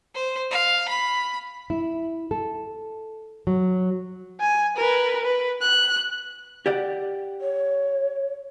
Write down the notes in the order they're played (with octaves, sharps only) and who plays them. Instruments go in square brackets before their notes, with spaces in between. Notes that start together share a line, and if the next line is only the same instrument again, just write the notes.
[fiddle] C5
F5
B5
[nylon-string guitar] E4
A4
F#3
[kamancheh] G#5
A#4 B4
B4
F#6
[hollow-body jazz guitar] G4 D5 F#5
[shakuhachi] C#5